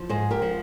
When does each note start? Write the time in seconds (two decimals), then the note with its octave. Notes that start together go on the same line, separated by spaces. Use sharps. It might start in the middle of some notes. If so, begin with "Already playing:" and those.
Already playing: F3
0.09 G#2 G#4 C5
0.31 G4 A#4
0.42 F3